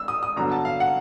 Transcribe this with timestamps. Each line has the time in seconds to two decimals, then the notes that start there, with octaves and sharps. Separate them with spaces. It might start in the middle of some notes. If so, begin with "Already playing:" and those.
Already playing: E6
0.08 D#6
0.23 D#6
0.36 G2 D3 F#3 B3 A#5
0.52 A5
0.65 F5
0.80 F#5